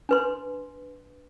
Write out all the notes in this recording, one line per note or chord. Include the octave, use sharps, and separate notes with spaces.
D4 B4 C6